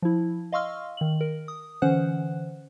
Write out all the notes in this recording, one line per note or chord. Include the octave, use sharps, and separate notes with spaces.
F3 E4
D#5 F5 C6 C#6 E6 F6
D#3 F#7
A#4
D#6
D3 E3 C#4 C5 F#5 F#6